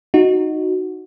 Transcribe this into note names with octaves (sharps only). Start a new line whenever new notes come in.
D#4 F#4